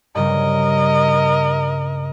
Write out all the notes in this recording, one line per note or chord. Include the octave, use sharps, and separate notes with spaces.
G2 C#3 G3 A#4 D#5